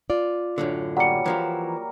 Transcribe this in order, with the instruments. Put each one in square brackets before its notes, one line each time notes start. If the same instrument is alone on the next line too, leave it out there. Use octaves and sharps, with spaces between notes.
[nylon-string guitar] F4 D5
[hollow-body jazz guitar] F#2 A2 D3
[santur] F#3 G3 A#3 [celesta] F#5 C#7
[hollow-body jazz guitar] E3 F3 E4 [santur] A#4